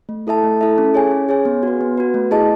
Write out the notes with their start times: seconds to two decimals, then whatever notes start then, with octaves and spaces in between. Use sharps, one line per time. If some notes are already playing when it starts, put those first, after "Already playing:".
0.09 A3
0.27 E4 A4 E5 A5
0.44 A3
0.61 E4 A4 E5 A5
0.78 C#4
0.94 G#4 C#5 G#5
1.11 C#4
1.29 G#4 C#5 G#5
1.45 B3
1.63 F#4 B4
1.81 B3
1.98 F#4 B4
2.14 A3
2.31 E4 G#4 D#5 A5